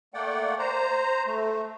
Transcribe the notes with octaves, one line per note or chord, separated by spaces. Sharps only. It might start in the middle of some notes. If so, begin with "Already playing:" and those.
A3 A#3 D5 F#5 G5
C5 A#5
A3